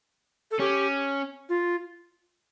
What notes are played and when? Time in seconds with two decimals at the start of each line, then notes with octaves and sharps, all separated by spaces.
0.51 A4
0.60 C#4 G4
1.49 F4